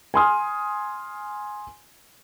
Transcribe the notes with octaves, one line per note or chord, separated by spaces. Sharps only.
G#5 C6 D#6 F6